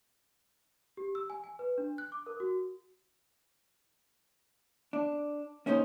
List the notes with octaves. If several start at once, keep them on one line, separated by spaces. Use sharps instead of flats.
G4
E6
G#5
G#5
B4
D4
F#6
D6
A#4
F#4
D4
A#3 C#4 D#4 A4 C5